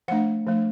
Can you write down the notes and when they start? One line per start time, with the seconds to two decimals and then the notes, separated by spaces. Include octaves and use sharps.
0.08 F3 A3 D4 F#5
0.47 F3 A3 D4